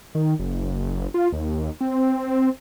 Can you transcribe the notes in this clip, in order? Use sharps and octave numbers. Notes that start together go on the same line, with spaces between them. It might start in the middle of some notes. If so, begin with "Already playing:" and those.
D#3
F#1
F4
D#2
C4